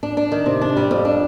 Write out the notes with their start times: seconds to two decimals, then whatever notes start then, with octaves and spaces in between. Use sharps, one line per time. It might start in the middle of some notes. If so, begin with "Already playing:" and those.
0.03 D4
0.17 D4
0.32 D#3
0.46 C3
0.61 D4
0.77 G3
0.91 F2
1.05 D4